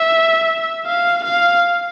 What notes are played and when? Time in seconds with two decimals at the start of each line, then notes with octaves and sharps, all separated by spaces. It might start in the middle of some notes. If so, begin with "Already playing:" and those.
Already playing: E5
0.86 F5
1.24 F5